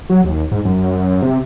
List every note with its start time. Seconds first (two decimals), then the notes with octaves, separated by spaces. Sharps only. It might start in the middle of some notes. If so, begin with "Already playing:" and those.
0.10 F#3
0.24 D#2
0.51 G#2
0.65 F#2
1.22 C3